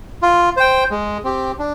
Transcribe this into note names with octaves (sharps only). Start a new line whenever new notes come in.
F4
C5 G5
G#3
C4 G4
D4